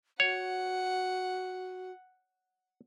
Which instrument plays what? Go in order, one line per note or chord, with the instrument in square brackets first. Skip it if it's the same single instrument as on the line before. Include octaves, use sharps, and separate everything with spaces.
[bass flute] F#4 [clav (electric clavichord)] C#5 [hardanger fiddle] F#5